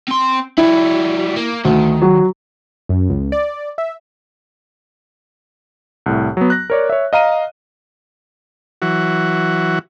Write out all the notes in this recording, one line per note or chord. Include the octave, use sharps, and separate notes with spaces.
C4 C6
G3 E4 F#4
A#3
D2 D#3
F#3
F#2
C#2
D5
E5
C2 A2
F#3 B3
F#6 A#6
A#4 C#5 D5
C#5 E5
D#5 F5 A#5 D#7
E3 F#3 F#4